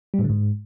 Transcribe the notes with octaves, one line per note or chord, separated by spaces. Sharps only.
G3
A2
D3
G#2